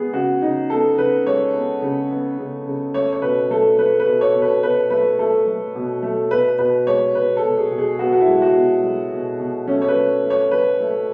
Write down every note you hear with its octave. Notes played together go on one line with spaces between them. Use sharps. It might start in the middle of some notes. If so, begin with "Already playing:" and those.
Already playing: G#3 B3 G#4
C#3 F#4
C#3 D#4
B3 A4
C#3 B4
G#3 C#5
B3
C#3
B3
C#3
C#3
A3 C#5
C#5
B2 B4
A3 A4
A3 B4
B4
B2
C#5
B2
B4
B2 B4
A3 B4
A3 A4
A3
B2
A3
B2 B4
B2 B4
G#3 C#5
B2 B4
A4
B2
G#4
B2
G#4
B3 F#4
F#4
E4
G#3
F#4
B2
G#3
B2
B2
A3 C#4
C#5
B4
A3
A3
C#5
A3 B4
A3